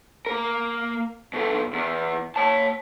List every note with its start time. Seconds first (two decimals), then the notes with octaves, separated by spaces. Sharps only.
0.26 A#3 A#4
1.33 B2 A4
1.73 E2
2.36 C#5 A5